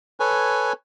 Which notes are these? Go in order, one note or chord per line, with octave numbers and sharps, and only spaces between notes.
A4 B4 C#5 G#5